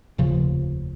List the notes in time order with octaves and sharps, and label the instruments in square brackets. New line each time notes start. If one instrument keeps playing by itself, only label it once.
[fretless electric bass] F1 D#2 C#3 F3